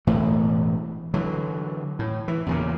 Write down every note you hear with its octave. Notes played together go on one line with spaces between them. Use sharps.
E1 A2 E3 A3
D3 E3 F#3
A2
E3
E2 A#2 C#3